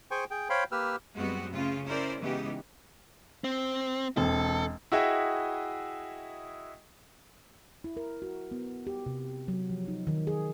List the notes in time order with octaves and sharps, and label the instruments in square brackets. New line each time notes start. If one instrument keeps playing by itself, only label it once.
[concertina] G#4 C5 G5 G#5 C#6
G#4 G5
C5 C#5 F5 G5 B5 C6
A#3 G4 B4 E6 F6
[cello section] F#2 G3 G#3 B3 C4 F#4
C#3 A3 F4
C#4 E4 A#4 C5 D5
C#3 E3 G#3 B3 D#4 G4
[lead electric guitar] C4
[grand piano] E1 C4 [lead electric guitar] A4
[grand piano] E4 F#4 G#4 D#5 E5 G5
[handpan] E4
A#4
F#4
B3
G4
C3
F#3
F3
D#4
D#3
G#4